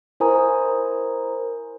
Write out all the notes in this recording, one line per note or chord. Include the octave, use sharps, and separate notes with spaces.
E4 A#4 C5 G#5 A#5 D#6